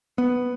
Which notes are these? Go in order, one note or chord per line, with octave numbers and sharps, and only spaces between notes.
B3